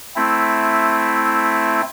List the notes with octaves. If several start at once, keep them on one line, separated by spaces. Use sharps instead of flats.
A3 C4 E4